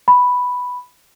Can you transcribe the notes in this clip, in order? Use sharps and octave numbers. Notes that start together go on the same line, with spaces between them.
B5